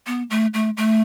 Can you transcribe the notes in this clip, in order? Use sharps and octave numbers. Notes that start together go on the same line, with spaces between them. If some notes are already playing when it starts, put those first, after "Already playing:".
B3
A3
A3
A3